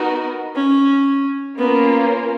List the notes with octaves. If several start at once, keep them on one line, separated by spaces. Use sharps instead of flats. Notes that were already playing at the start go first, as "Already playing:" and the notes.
Already playing: B3 D#4 F#4 A#4 D#5
C#4
A#3 B3 C#4 F4 A#4